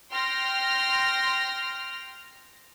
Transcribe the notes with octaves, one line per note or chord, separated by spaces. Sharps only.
G5 C6 F6 A#6